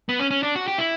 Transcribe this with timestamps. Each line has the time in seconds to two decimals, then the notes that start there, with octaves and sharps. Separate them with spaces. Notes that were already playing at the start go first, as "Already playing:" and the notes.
0.09 B3
0.20 C#4
0.31 C#4
0.43 D4
0.56 F#4
0.68 G4
0.78 E4